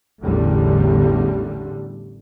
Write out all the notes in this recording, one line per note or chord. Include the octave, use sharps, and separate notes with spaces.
A1 E2 D3 G3 A3